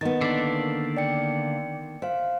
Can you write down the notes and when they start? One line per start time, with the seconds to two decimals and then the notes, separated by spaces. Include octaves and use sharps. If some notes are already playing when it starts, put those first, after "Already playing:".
0.01 D#3 B3 D#5 A6
0.21 D3 A#3 D4 E6 B6 C7
0.97 D5 G5 C#7
2.02 C5 E5 F5